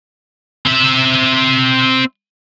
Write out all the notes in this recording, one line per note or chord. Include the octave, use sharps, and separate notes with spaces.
C4 E5